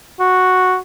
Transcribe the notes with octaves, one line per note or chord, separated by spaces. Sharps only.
F#4